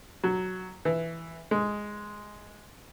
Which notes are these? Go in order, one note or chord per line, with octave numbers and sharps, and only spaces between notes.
F#3
E3
G#3